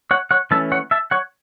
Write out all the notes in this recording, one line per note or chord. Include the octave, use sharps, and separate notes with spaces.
C#5 F#5
C#5 F#5
E3 A3 C#4 E5 A5
C#5 F#5
E5 A5
C#5 F#5